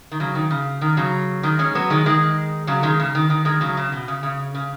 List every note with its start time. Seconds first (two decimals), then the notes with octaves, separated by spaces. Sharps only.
0.12 D#3
0.20 C#3 F#3
0.35 D#3
0.51 C#3
0.81 D#3
0.97 C#3 F#3
1.43 D#3 G#3
1.59 G#3 C#4
1.75 F#3 B3
1.90 D#3 G#3
2.06 D#3 G#3
2.67 C#3 F#3
2.83 D#3 G#3
3.00 C#3
3.15 D#3
3.30 D#3
3.45 D#3 G#3
3.61 C#3 F#3
3.77 C#3
3.92 B2
4.08 C#3
4.23 C#3
4.55 C#3